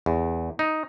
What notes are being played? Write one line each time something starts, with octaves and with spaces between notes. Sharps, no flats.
E2
D#4